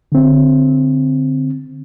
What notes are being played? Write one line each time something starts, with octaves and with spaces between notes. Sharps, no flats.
D3 C4